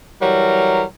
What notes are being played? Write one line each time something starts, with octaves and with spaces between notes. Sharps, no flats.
E3 F#3 G3 A#4